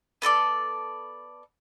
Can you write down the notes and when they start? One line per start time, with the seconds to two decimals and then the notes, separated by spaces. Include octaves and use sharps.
0.22 B3 A4 B4 D5